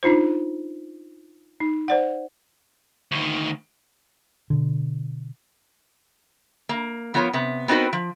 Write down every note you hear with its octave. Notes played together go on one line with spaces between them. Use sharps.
D4 D#4 F4 C5
D#4
C5 D5 F#5
D2 D#3
B2 D3
A#3
F3 B3 F4 A#4 C#5
C3 B3
B3 C4 D#4 F#4 A#4 B4
F3